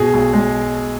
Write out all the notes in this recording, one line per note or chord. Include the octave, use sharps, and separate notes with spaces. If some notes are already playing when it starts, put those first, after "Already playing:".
Already playing: B2 G#4
B1
G#3